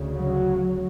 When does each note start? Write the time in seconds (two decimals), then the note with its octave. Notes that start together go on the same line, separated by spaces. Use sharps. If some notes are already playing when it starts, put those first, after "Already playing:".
Already playing: D2 C#3
0.17 F#3